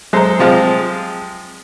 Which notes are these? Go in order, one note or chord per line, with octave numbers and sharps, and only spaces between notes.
F#3 G#3 A4 C5 A#5
C3 F3 G#3 C5 F5